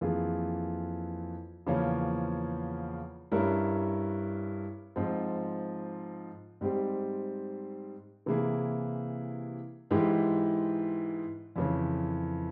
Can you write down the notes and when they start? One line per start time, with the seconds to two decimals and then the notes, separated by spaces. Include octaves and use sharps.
0.01 F2 E3 A#3 F4 G#4
1.67 E2 C#3 F3 A#3 C#4
3.32 G2 G3 C#4 E4 A#4
4.96 G#2 F3 C4
6.61 G#2 G3 C4 G4
8.26 C3 E3 A#3 E4 G#4
9.91 G#2 E3 G#3 E4 G4
11.56 F2 C#3 E3